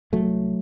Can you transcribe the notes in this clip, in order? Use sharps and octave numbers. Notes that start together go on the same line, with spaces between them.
C2 F#3 A3